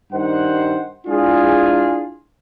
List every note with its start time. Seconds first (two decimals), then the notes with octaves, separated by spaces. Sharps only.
0.12 G2 D#3 G3 C5 F#5
1.07 G#3 D4 E4 F4 G#4